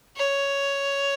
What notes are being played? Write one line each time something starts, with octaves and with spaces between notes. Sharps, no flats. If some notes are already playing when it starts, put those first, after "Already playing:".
C#5